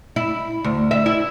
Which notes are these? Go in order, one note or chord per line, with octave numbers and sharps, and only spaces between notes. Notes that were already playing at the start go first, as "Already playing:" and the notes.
E4
D2
E5
E4